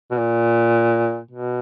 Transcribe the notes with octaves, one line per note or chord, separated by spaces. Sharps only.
B2
A#2
B2